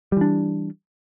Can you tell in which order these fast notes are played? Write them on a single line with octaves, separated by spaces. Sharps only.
G3 E3 D4